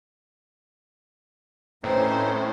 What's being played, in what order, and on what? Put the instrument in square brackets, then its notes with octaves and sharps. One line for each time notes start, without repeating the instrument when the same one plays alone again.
[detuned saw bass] A2 [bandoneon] E3 C4 D#4 [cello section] A3 C#4 [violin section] C5